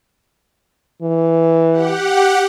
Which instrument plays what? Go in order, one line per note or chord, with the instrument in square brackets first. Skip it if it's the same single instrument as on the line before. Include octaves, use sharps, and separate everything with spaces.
[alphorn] E3
[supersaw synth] G4 F#5